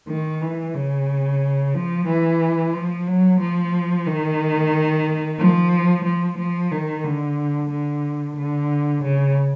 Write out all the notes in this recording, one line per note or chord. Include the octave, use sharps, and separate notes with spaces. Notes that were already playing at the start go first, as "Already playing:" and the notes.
D#3
E3
C#3
F3
E3
F3
F#3
F3
D#3
F3
F3
F3
D#3
D3
D3
D3
C#3